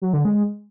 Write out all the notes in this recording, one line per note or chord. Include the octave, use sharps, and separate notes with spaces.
F#3
D3
G#3